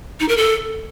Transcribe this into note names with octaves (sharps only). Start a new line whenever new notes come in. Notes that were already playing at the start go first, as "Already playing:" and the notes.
D#4
A#4
A4